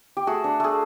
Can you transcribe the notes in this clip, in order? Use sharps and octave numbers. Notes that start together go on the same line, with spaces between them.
G4
A3 F#4 G#4
D4
A3 G#4